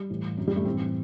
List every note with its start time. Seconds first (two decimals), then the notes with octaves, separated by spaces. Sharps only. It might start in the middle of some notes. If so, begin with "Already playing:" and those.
Already playing: G3
0.10 A2 E3
0.37 F#2 D3 F#3
0.47 G3
0.56 A3
0.65 A2 E3 C4